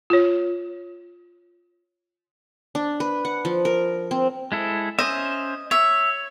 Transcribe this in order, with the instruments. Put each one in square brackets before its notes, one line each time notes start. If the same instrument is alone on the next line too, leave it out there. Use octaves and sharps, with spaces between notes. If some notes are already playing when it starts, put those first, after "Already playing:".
[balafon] F4 C#5
[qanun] D4
B4
F#5
F3
A#4
C4
[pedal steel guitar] G#3 E4 A4
[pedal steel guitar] C#4 C5 E5 [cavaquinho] D#5
[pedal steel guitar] C#5 [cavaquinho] E5